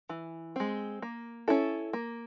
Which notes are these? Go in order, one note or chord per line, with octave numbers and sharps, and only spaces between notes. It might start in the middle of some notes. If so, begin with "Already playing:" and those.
E3
G#3 C4
A#3
C#4 E4 A4
A#3